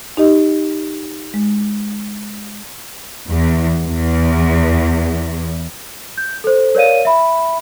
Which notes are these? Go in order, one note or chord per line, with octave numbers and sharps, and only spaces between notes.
D#4 G4 D#5
G#3
E2
E2
G6
A4 C5
A#4 C#5 D5 F5 D#7
E5 B5